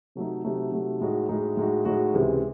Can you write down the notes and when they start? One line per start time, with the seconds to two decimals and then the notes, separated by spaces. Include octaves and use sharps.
0.15 C3 F#3 A3 D#4
0.44 C3 F#3 A3 D#4
0.72 C3 F#3 A3 D#4
1.01 A2 G#3 D#4 F#4
1.29 A2 G#3 D#4 F#4
1.57 A2 G#3 D#4 F#4
1.85 A2 G#3 D#4 F#4
2.14 C#2 C3 E3 G#3